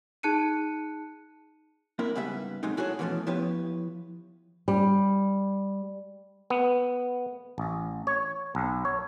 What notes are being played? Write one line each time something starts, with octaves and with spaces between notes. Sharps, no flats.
D#4 G#4 A5 F#6 C#7 D#7
A#3 C4 D4 E4 A#4
G#2 C#3 G3 B3 B4 E5
B2 F#3 G#3 A3 C4 D#4
E4 F#4 G#4 A4 C#5
B2 E3 F3 G#3 A3 C#4
F3 B3 E4 G4 B4 C#5
G3
B3
A1
C#5
B1
C#5